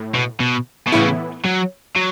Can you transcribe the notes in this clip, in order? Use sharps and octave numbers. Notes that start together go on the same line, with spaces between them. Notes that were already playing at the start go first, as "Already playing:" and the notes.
Already playing: A2
B2
B2
B2
A2 C#3 E3 B3 E4
F#3
F#3